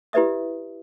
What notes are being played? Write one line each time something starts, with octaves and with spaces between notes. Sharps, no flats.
E4 G4 B4 D5 E5 D#6